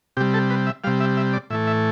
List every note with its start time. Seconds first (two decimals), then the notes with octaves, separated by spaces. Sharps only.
0.17 C3 G4
0.20 G3
0.34 A4
0.50 B4
0.67 E5
0.84 C3 G3 F5
1.00 E5
1.17 E5
1.33 D5
1.50 A2 E3 A3 E5
1.67 E5